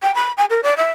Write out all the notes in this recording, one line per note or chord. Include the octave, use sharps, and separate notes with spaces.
G5
B5
G#5
A#4
D5
E5